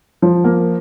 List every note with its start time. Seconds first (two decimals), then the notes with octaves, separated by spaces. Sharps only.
0.22 F3
0.44 A#3